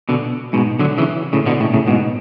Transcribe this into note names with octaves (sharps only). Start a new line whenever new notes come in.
B2 D3
G#2 B2
D3 F#3
C#3 E3
A2 C#3
B2 D3
A2 C#3
A2 C#3
G#2 B2